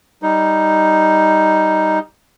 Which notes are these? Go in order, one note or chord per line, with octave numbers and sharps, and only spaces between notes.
G3 D#4